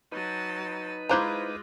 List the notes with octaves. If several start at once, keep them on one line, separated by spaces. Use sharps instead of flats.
F#3 D#4 B4 A5
G#3 E4 F4 C5 F5 A#5 D6 F#6